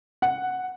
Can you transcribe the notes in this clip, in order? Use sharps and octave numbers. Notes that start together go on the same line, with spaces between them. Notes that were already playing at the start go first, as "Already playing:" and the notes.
F#5